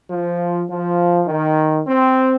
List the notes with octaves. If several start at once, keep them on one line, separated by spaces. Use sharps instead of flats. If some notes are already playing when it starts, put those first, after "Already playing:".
F3
F3
D#3
C4